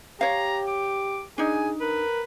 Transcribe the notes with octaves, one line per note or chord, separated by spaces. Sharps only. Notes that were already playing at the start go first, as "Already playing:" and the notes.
G4 C#5 F5 A#5
D6
D4 D#4 G#4 G#5
A#4 B4